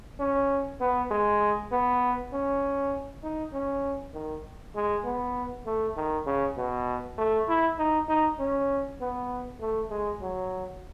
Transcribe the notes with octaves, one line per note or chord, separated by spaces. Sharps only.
C#4
B3
G#3
B3
C#4
D#4
C#4
D#3
G#3
B3
A3
D#3
C#3
B2
A3
E4
D#4
D#4
C#4
B3
A3
G#3
F#3